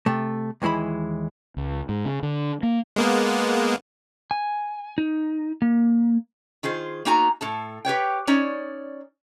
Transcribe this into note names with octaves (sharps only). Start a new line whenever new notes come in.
C3 A3
D#2 E3 G#3 E4 B5
C#2
G#2
C#3
D3
A#3
G#3 A#3 B3
G#5
D#4
A#3
D#3 F4 G#4 C5
A#3 B3 D#4 F#4 G#5 A#5
A2 A4 A5
G4 B4 C#5 G5
C#4 D#4 C#5 D5